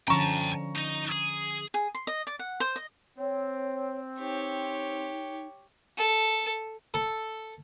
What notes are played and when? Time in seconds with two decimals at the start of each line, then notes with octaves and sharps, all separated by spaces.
0.08 D3 F3 C#4 G5 A5 A#5 C#6
0.76 D#4 D#5
1.12 G#4
1.74 G#4
1.95 C6
2.07 D#5
2.27 D5
2.39 F#5
2.60 C5
2.76 D#5
3.18 C4 C#5
4.19 D#4 G4 C#5
5.97 A4
6.94 A4